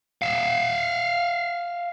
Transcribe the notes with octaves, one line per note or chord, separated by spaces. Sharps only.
E5 F5